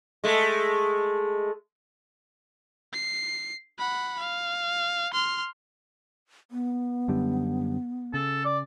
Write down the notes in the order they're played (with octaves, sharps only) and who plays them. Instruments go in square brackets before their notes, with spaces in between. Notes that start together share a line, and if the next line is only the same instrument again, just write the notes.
[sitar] G#3 A3
[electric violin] C7
F#5 B5
F5
C6 F6
[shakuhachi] B3
[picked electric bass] F#2 D3 G3
[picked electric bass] C#3 [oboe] A4
[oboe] D5